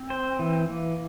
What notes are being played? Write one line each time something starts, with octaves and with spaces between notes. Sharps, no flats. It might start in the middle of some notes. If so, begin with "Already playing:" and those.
Already playing: C4
C5
E3
E3 A#3